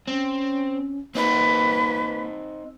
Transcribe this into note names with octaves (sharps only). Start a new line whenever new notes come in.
C4 C#4
A#3 C4 D#4 B4